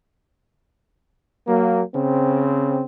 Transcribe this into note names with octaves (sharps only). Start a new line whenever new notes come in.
F#3 A#3
C#3 C4